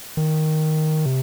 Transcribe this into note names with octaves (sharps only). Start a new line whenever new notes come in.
D#3
C3